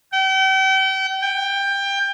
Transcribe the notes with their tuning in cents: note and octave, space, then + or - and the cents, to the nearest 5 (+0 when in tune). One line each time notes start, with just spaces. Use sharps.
G5 -40
G5 +20